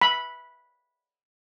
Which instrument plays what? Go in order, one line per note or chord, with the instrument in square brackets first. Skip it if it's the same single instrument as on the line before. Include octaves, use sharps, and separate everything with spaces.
[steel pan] B5